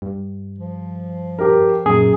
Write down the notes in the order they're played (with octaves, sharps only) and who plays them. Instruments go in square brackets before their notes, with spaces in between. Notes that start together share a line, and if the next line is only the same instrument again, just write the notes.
[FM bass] G2
[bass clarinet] F3
[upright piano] G4 A#4
[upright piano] F#2 [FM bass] A#2 [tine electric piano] G#4